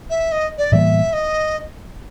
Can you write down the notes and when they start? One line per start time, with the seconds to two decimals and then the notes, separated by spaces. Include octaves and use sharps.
0.09 E5
0.31 D#5
0.57 D5
0.72 A2 E3 G3 A#3 E5
1.12 D#5